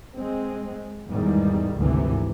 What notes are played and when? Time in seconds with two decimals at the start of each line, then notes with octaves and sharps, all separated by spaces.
0.16 G#3 C4
1.07 E2 G#2 D#3 G3
1.76 G#1 D2 C3 E3